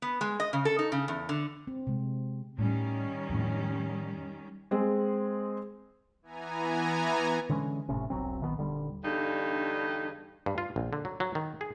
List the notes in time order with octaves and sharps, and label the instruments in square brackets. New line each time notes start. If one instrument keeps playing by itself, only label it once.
[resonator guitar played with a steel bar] B3
G#3
D#5
C#3
A4
D#4
C#3
E2
D3
[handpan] C4
C3 G#3
[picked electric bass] A2 [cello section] D#3 G3 C#4
[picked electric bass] F2 A2
[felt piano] G#3 C4 G#4
[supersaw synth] E3 B3 G#5 A#5
[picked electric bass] D3 E3 G#3 C#4
G1 A2 C3 C#4
E1 B1 F#3 C4
A#1 D#3 G3 B3
D#1 D3 G3
[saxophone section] E2 G2 D3 D4 D#4
[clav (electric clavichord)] G2
F4
A#1
D3
F#3
F#3
D#3
G#4